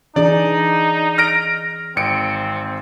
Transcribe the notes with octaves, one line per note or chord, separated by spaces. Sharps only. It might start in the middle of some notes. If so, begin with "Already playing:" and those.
E3 D4 D#4 G#4 D5
F6 A#6 D7
G#1 C4 C#7 D7